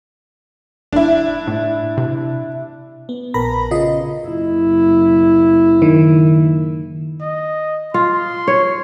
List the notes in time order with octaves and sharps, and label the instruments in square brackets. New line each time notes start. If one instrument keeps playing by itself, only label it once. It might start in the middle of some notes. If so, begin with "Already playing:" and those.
[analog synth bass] F#1 [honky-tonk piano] D4 E4
[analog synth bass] A2
C3
[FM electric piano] B3
A#1 A#4 B4 A#5 B5 A#6
C#3 F4 D#5
[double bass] F#1 E4
[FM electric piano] D#3
[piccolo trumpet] D#5
[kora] F4 [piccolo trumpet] C6
[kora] C#5